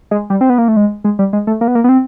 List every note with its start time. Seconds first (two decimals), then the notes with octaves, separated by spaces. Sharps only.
0.11 G#3
0.30 G3
0.41 C4
0.50 B3
0.58 A#3
0.68 A3
0.77 G#3
1.04 G#3
1.19 G3
1.33 G#3
1.47 A3
1.61 A#3
1.68 B3
1.75 A#3
1.84 B3
1.89 C4